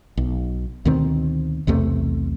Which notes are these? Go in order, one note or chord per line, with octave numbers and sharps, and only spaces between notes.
B1
D2 B2 D#3 C4
B1 E2 C3 A3